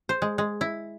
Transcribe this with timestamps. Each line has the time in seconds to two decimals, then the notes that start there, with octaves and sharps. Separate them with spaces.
0.09 C5
0.22 G#3
0.38 G#3
0.61 E4